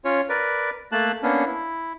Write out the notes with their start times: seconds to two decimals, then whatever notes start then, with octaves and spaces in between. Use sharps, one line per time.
0.05 C#4 F4 C#5
0.29 A#4 B4 D5
0.92 A3 A#3 A5 F#6
1.23 A#3 B3 C#4 D4
1.46 E4